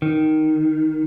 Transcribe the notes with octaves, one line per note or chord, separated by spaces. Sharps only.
D#3